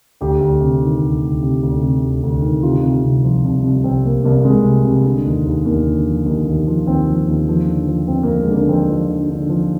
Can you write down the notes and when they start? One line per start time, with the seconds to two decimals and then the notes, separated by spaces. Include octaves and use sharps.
0.21 D2 G4
0.41 D2
0.61 C3
0.82 D#3
1.01 D2
1.22 D2
1.43 C3
1.63 D2
1.83 C3
2.03 D2
2.23 D2
2.42 D#3
2.63 C3 F4
2.83 C3
3.03 C2
3.24 F3
3.44 C2
3.64 C2
3.84 C2 C4
4.05 C2 A#3
4.24 C2 A#3
4.45 C2 G#3
4.65 C3
4.85 C3
5.05 D3
5.25 D#2
5.46 D#2
5.65 D#2 A#3
5.86 D3
6.07 F3
6.26 D#2
6.47 D#2
6.67 F3
6.87 D#2 C4
7.07 F3
7.28 D#2
7.48 F3
7.67 D3
7.88 F3
8.08 F2 C4
8.23 F2 A#3
8.39 G#3
8.49 D3
8.54 A#3
8.69 F2 C4
8.89 F3
9.10 D3
9.30 D3
9.49 F3